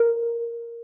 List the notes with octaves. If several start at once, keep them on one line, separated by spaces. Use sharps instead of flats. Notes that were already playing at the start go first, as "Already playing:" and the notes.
Already playing: A#4